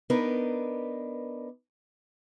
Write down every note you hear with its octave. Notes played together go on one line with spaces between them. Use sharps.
B3 D4 D#4 A#4 B4